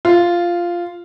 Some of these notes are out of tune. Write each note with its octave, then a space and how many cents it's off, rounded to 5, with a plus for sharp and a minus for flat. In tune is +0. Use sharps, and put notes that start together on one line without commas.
F4 -5